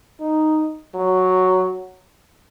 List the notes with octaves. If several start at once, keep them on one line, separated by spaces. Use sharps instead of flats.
D#4
F#3